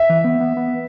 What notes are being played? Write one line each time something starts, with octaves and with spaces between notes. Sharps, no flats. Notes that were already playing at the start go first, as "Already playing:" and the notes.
Already playing: E5
E3
B3
B3
B3